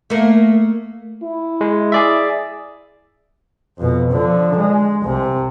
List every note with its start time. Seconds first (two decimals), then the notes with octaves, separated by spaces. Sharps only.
0.10 A3 A#3
1.23 E4
1.61 G#3
1.92 G#4 D5 E5
3.78 F2 B2
4.11 D3 F3
4.57 G#3
5.03 C2 C3